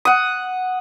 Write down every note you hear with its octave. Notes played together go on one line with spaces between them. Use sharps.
F#5 D#6